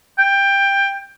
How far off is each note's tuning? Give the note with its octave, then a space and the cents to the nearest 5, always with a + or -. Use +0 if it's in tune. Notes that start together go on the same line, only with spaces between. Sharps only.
G5 +15